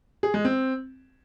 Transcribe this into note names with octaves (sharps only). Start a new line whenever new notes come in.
G#4
G#3
C4